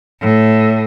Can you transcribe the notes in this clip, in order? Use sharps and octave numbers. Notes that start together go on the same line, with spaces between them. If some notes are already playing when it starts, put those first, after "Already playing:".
A2